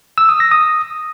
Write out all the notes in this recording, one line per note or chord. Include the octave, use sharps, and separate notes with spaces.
E6
D#6
A#6
D#6